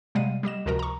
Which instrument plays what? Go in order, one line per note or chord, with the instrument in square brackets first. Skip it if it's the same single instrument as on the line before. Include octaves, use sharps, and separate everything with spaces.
[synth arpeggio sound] C3 G3 G#3 F5 F#5 D#7
G3 G4 D#5 E7
C#2 C3 F3 F#4 A#4 A#5
A#5 C#6